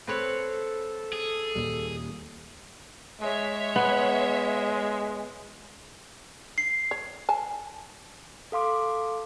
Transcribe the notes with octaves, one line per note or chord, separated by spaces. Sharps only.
C4 A4 B4 C#5
G#4
D#2 A#2 G3
G#3 C#5 E5
B3
C7
C#5
G#5 A5
A4 F5 C6 D6